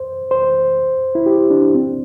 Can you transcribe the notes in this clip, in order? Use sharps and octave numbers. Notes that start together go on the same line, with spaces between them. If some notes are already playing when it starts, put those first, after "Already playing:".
Already playing: C5
C5
E4
G4
D4
C4